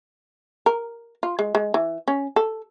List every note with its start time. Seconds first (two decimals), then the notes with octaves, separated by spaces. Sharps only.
0.66 A#4
1.23 F4
1.39 G#3
1.55 G#3
1.74 E3
2.08 C#4
2.36 A4